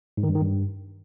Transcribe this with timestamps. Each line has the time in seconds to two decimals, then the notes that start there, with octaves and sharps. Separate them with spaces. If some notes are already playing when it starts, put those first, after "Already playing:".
0.17 G#2
0.23 D#3
0.29 G2
0.35 D#3
0.41 G2